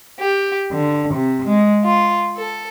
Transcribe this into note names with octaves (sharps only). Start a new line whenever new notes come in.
G4
D3
C3
G#3
F4
A4